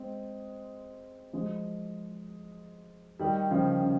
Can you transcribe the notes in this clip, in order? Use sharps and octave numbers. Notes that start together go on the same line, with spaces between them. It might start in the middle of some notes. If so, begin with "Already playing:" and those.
Already playing: G#3 C4
F3 G#3
D#3 G3
C#3 F3
C#3